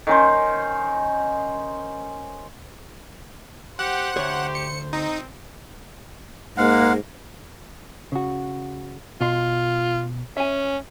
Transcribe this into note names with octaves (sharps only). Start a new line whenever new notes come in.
D#3 C#4 C5
G4 C5 F#5
D2 G4 C#5
C#7
C4 D#4
G#2 G#3 A#3 F5 F#5
C#3 F#4
B2 F4 C6
C#4 E5 G#5